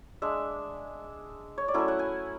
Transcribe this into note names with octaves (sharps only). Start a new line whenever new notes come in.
G#3 D4 E5
C#5
D5
F#3 A3 C#4 E4 E5
F#5
G#5